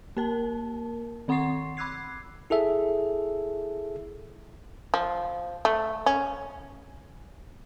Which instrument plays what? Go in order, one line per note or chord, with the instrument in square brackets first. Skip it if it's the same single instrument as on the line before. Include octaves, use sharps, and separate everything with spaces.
[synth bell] A#3 A#4 A5
D#3 C4 F#5 C6 C#6 C7
B5 D6 E6 F#6 G#6 C7
[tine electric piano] E4 G#4 A4 E5
[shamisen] F3
A3
C#4